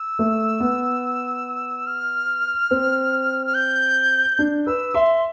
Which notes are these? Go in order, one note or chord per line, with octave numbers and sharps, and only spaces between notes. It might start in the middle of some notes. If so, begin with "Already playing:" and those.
Already playing: E6
A3
B3
F6
C4
F6
G6
D4
B4 E6
E5 C6